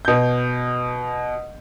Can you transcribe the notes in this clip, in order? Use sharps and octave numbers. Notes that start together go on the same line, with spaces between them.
B2 G6